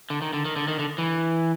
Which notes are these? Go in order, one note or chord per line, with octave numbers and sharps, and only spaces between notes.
D3
D#3
D3
D#3
D3
D#3
D3
E3